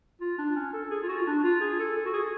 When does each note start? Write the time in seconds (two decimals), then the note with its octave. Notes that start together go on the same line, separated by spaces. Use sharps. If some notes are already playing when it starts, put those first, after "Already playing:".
0.21 F4
0.39 D4
0.56 C#4
0.73 A4
0.91 G#4
1.03 F4
1.08 F#4
1.17 F4
1.27 D4
1.44 F4
1.61 G#4
1.79 A4
1.96 A4
2.06 F#4
2.13 G#4